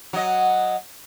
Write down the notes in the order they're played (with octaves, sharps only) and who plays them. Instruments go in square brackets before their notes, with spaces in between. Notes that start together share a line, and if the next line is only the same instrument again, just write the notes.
[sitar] F#3 D#5